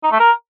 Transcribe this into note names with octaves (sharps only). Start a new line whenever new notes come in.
D#4
A3
A#4